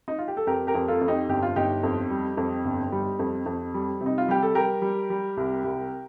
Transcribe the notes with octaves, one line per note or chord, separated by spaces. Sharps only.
D#4
F4
G4
A4
F2 G4 A#4
G4 A#4
F2
F4 A4
F2
D#4 G4
G1 G4
F4
G1 D#4 G4
F2
G3
F2
G1
G3
F2
F2
G3
C3
D#4
F4
G3 G4
A4
G3 G4 A#4
G3
G3
C2
C2